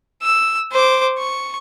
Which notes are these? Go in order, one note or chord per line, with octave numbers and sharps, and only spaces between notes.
E6
C5 D6
C#6